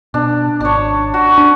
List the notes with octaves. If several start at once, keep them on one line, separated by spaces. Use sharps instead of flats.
B2 D4
G#1 D4 C#5
F#4
D4